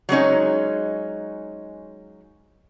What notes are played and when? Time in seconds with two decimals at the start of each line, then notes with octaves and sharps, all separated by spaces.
0.09 F#3 G#3 C#4 D#4